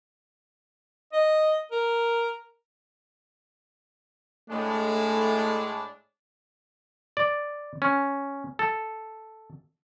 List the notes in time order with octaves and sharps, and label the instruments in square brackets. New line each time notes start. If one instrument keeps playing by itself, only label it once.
[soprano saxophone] D#5
A#4
[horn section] A2 G#3 D4 [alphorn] A3
[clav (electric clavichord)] D5
C#4
A4